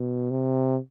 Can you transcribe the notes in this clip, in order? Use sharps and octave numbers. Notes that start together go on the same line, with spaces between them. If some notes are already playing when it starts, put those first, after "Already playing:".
Already playing: B2
C3